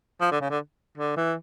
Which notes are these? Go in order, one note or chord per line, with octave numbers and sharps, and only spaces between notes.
F3
D3
C#3
D3
D3
E3